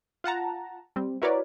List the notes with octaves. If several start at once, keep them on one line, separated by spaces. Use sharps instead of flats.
F4 F#5 A5 A#5
G3 C4
E4 F#4 A#4 B4 C#5 D5